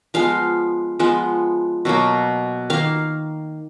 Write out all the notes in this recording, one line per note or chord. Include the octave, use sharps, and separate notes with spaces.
F3 G#3 B3 F5
F3 G#3 B3
B2 F#3 A#3
D#3 A#3 F5